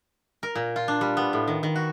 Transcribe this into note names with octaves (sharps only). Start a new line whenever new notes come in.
A#4
A#2
F4
D4
G3
B3
A2
D#3
D#3
F#4